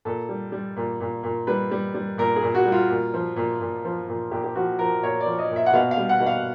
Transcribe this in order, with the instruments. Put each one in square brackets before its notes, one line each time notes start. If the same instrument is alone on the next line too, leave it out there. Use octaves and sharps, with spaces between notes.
[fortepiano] A#2 A4
G3
G3
A#2
A#2
A#2
G3 B4
G3
G3
A#2 A#4
G#4
A#2
F#4
G3
F4
A#2
F3
A#2
A#2
F3
A#2
A#2 G4
G4
F3 F#4
F3 A#4
A#2 C#5
D5
F3
D#5
A#2
E5
F#5
B2 F5
F5
G3
F#5
B2
F5